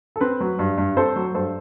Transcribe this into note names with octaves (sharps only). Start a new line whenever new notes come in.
A4
C4 B4
F#3
G2
G2
C4 A4 C5
F#3
G2 A4 C5